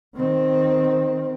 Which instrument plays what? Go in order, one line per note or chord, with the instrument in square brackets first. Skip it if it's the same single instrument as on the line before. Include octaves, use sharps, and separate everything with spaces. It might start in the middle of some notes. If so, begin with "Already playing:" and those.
[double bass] D#3 C4